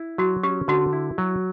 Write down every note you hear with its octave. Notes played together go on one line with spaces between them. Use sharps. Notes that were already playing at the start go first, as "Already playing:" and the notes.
Already playing: E4
F#3 F#4
C#4 G4
D3 F#4
E4
F#3